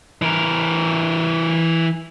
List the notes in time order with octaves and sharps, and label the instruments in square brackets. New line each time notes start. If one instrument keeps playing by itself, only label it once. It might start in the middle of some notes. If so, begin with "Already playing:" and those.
[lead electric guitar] E3 A#4